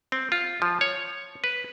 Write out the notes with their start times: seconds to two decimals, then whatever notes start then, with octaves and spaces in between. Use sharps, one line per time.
0.12 C4
0.32 F4
0.62 F3
0.81 C#5
1.44 B4